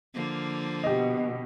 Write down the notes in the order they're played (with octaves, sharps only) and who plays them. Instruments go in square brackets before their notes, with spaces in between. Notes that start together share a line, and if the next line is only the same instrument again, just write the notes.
[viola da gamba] D3 F3 A#3
[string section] B2 [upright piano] G4 D#5